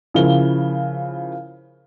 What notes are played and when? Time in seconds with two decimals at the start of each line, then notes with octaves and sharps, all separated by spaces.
0.14 C#3 F3 E4 A#4 G7